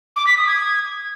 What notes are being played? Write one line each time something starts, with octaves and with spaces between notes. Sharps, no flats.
D6
B6
D#6
G#6